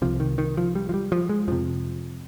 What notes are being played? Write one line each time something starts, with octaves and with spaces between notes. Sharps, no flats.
C2 C3 F3
D#3
D#3
F3
G3
F3
G3
F3
G#3
F2 C3 F3